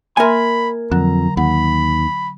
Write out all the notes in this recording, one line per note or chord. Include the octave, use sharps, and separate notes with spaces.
A#3 A#4 E5 G#5 B5 C6
F2 D3 F#3 A#5
D#2 F#5 B5